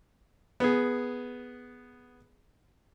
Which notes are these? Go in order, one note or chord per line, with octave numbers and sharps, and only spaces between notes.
B3 G#4